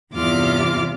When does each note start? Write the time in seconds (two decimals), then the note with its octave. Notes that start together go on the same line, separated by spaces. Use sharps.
0.13 E2 G2 C3 F4 D6 F6